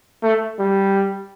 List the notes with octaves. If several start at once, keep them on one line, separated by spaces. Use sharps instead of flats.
A3
G3